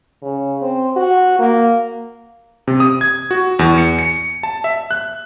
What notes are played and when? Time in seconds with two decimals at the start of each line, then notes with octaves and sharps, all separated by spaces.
0.22 C#3
0.62 C4
0.96 F#4
1.39 A#3
2.68 C3
2.80 D#6
3.01 G#6
3.31 F#4
3.59 E2
3.78 C#7
3.99 C#7
4.43 A5
4.64 E5
4.91 F#6